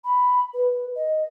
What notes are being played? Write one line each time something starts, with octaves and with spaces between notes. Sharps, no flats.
B5
B4
D#5